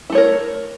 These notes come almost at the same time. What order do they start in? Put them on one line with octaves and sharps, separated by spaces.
E4 A3 C#5 A#4